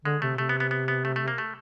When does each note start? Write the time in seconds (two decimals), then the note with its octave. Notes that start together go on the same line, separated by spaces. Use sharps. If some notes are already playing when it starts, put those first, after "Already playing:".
0.05 D3 G#3
0.22 C3 A3
0.38 C3 A3
0.49 B3
0.60 B3
0.71 B3
0.88 B3
1.05 A3
1.16 A3
1.28 A#3
1.38 A3